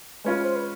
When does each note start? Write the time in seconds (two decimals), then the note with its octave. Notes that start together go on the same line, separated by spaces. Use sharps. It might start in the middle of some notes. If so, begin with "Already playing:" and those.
0.24 G#3 C#4 F4 B4
0.43 C5
0.56 B4